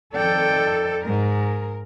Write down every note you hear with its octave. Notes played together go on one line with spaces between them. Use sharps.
F2 D#3 A4 D5 G5
G#2 G#3 A#4